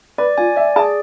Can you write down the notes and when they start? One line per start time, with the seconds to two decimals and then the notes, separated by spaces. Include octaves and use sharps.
0.18 B4 D5
0.38 F4 G#5
0.56 D5 E5
0.76 G#4 A5